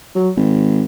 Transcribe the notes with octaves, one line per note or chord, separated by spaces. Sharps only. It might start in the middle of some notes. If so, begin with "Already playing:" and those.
F#3
G#1